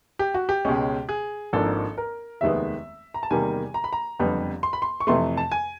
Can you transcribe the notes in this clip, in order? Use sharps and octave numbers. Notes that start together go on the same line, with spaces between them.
G4
F#4
G4
C#2 B2 G#3 C#4
G#4
G#1 G#2 F3 A#3 D4 A4
A#4
F1 D#2 D#3 G#3 B3 E5
A#5
A5
E2 C3 D#3 G3 A#3 G#5
A#5
B5
A#5
F#1 F2 D3 G3 B3
C6
B5
C6
C#6
F2 C3 E3 A3 C6
A5
G#5